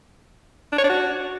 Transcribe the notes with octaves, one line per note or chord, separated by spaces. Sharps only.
D4
C#5
D4
F#4